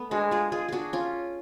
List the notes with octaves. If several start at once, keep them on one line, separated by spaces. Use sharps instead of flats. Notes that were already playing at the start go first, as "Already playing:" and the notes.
Already playing: A3 B3
G#3 D4 F#4
F4 G#4
F4 G#4
D4 F#4 G#4
C#4 F4